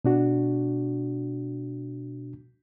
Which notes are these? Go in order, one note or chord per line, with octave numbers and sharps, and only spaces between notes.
B2 D4 F#4